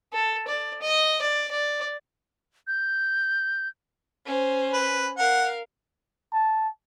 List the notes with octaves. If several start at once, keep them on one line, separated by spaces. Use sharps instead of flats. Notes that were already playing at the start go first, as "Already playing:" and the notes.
A4
D5
D#5
D5
D5
G6
C#4 C5
B4
A#4 F5 F#5
A5